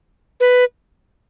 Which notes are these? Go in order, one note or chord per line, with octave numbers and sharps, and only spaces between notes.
B4